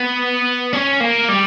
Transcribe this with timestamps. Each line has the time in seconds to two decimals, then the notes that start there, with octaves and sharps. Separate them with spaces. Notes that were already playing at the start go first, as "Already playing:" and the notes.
Already playing: B3
0.73 C#4
1.00 A#3
1.28 G3